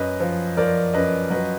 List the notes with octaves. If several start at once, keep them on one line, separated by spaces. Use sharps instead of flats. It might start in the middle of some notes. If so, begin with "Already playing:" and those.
Already playing: F#2 B4 D#5
F3
F3 A#4 D5
F#2 B4 D#5
F#3 B4 D#5